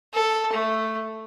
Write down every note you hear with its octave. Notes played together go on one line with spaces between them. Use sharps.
A4
A3